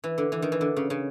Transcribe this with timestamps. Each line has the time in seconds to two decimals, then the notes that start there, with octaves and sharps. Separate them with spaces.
0.04 E3
0.18 D3
0.32 E3
0.42 D#3
0.52 E3
0.61 D3
0.76 C#3
0.90 C#3